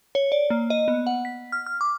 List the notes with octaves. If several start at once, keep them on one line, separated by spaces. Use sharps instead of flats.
C#5
D5
A#3
D#5
B3
F#5
B6
F6
F6
D6